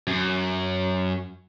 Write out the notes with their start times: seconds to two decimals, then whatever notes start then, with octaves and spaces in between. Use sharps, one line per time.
0.08 F#2